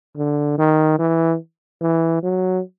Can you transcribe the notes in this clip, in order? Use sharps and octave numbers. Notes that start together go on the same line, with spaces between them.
D3
D#3
E3
E3
F#3